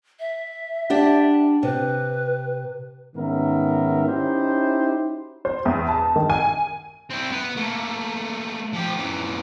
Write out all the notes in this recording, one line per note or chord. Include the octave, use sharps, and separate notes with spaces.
E5
D4 G4 F#5
C3 B4
G#2 D#3 B3 C#4 A#4 E5
C#4 D#4 E4 F#4 G4 C5
C5
E2
A5
D#3
G#5
C4 E4
B3 B4
A3 A#3
F3 G4
F#2 E3